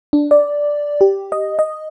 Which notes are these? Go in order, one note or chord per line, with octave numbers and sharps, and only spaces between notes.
D4
D5
G4
D#5
D#5